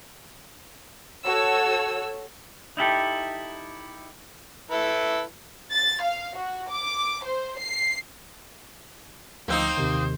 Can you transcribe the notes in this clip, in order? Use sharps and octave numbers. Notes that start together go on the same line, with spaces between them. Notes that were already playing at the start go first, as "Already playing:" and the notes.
F#4 A4 C#5 E6
D#4 E4 G4 A4
E4 A4 B4
A6
F5
F#4
D6
C5
C7
D2 F3 A#3 C4 D#4 C5 E6
D#2 C3 D#3